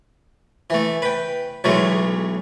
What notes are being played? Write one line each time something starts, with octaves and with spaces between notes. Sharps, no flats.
E3 A3
B4 G5
B1 E2 F#3 G#3 A3